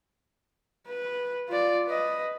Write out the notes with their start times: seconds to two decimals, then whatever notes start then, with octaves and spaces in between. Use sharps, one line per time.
0.88 B4
1.49 F4 D5
1.88 B4 D#5